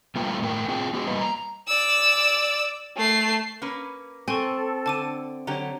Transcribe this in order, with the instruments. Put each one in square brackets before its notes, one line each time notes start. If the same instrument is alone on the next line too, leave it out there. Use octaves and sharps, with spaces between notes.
[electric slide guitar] G3 A3 A#3 F4 B4 G5
A2 A#4 F#5 G5
C4 F4 G#4 G5
B3 F#4 G#4
G3 A#3 B4 D#5
A#5
[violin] D5 E6
A3 C7
[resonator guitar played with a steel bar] A#3 C#4 B4
[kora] C4 [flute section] A4 [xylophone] G#5 C6 C#6
[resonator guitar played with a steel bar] D3 [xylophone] A5 D6 D#7
[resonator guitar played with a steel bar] D3 F#3 G4 [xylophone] C#5 A#5